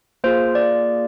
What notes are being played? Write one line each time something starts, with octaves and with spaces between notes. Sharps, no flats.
A#3 F4 G#4 C5
D5